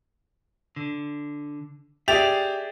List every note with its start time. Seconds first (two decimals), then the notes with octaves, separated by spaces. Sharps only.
0.76 D3
2.08 G4 G#4 D5 E5 A6 F7